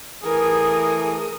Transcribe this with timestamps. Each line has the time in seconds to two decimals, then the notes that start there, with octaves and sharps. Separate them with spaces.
0.23 E3 A3 G#4 A#4 D#6